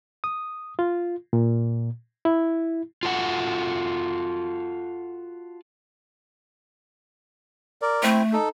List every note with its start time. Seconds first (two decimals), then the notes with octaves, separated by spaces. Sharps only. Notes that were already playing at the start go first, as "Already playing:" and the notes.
0.24 D#6
0.79 F4
1.33 A#2
2.25 E4
3.03 F4 F#4 A4 C#5 F#5
7.82 A#4 D5
8.03 A3 C4 E4 C5
8.33 D#4 A4